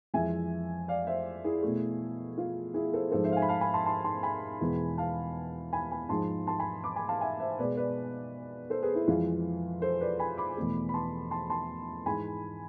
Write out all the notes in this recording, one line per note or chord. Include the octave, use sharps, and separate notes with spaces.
F2 E3 G#3 E5 G#5
D5 F5
C5 E5
E4 G#4
B2 A3
F4
E4 G#4
A4 C5
G#2 F3 G#3 A4 C5
C5 E5
F5
E5 G#5
B5
F5 A5
G#5 B5
A5 C6
A5 C6
A5 C6
G#5 B5
E2 B2 G#3
F5 A5
G#5 B5
G#5 B5
G#2 F3 G#3 A5 C6
A5 C6
G#5 B5
B5 D6
G#5 B5
F5 A5
E5 G#5
C5 E5
B2 G#3 B4 D5
B4 D5
A4 C5
G#4 B4
E4
F2 E3 G#3 F4
A4 C5
B4 D5
G#5 B5
B5 D6
E2 B2 A3
B5
A5 C6
A5 C6
A5 C6
G#2 E3 G#3 G#5 B5